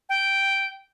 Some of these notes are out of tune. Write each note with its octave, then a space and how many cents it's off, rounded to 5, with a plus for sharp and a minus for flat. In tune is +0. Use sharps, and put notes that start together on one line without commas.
G5 -5